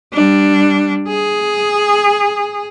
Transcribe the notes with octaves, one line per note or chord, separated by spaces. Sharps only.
G3 D4
G#4